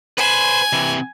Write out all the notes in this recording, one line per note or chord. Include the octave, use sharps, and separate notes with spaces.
B4 C5 G#5
C3 E3